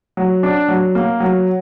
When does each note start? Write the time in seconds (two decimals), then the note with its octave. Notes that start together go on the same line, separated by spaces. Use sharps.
0.17 F#3
0.43 D4
0.68 F#3
0.95 A#3
1.20 F#3